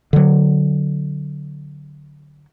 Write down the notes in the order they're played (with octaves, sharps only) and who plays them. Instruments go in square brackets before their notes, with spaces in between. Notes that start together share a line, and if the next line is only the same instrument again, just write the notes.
[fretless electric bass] D3 F#3